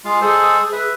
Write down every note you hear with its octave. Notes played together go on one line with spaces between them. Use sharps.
G#3 F4 F5
G#3 G#4 A4 C5
B4 E5